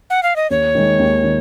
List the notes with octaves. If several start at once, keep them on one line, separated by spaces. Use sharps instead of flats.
F#5
F5
D#5
D#2 C#5
D#3 G#3
D#2
D#3